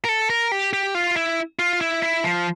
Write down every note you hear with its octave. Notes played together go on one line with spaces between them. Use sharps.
A#4
A4
A#4
G4
G4
F4
E4
F4
E4
E4
F3